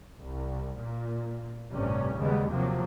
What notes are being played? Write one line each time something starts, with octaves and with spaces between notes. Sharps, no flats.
C2
A#2
A1 G2 C3 G3 C#4
D#2 C#3 G3 G#3 B3
C3 F3 F#3 A#3